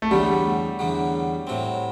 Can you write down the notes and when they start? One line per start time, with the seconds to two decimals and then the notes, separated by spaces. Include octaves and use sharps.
0.02 A3
0.11 E2 D3 F#3 G3
0.79 E2 D3 F#3
1.47 A2 F#3 C4